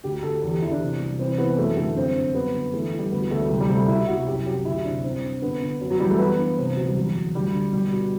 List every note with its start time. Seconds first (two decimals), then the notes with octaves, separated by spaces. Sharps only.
0.04 D2 G4
0.23 D2 A4
0.42 E2 A4
0.52 G4
0.62 E2 E4
0.72 D4
0.81 C3
1.00 C2
1.19 E3 C4
1.38 E3 B3
1.58 F#2 A3
1.77 D3 A3
1.96 G2 C4
2.16 G2
2.34 F#2 B3
2.55 D3
2.73 E3 A3
2.93 E3
2.98 G3
3.11 D2 B3
3.31 D2 A3
3.41 G3
3.50 C2
3.60 G3
3.70 C3 A3
3.88 B2 E4
4.07 C2 F#4
4.27 F#2 G4
4.46 F#2 G4
4.65 D2 E4
4.85 C3 D4
5.04 G2 C4
5.24 G2
5.42 D3 B3
5.62 D3
5.81 F#2
5.91 F#3
6.00 E3 G3
6.10 A3
6.19 E3 B3
6.38 G2
6.58 C3 C4
6.77 D2 F#3
6.87 G3
6.95 E2 F#3
7.15 E2
7.35 D2 G3
7.54 D3
7.73 B2 G3
7.92 B2